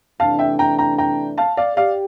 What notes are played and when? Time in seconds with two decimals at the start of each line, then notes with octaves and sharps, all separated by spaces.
0.20 C3 E3 A3 D4 F5 A5
0.39 E5 G5
0.59 G5 A#5
0.79 G5 A#5
0.98 G5 A#5
1.38 F5 A5
1.57 D5 F5
1.77 G4 D5 F5